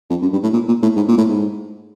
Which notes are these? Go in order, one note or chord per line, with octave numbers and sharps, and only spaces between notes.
F2
F#2
G2
A2
A#2
A#2
A2
G#2
A#2
A2
G#2